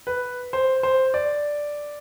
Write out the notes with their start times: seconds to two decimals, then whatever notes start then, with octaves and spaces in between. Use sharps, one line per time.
0.07 B4
0.53 C5
0.83 C5
1.14 D5